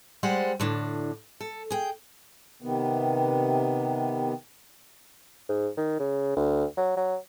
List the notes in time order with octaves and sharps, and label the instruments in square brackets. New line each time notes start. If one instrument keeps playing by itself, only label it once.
[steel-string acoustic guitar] G3 G#3 C5 D5 F#5
A2 D3 D4
A4
G#4 G5
[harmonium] C3 D#3 B3
[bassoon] G#2
D#3
C#3
D2
F#3
F#3